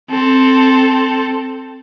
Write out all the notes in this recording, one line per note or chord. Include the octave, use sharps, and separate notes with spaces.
C4 A4